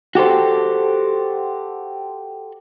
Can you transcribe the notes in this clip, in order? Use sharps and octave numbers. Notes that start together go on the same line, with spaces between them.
F#4 G4 A4 C5